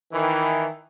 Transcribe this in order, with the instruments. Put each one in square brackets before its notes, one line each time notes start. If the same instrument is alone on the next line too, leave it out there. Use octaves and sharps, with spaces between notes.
[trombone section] D#3 E3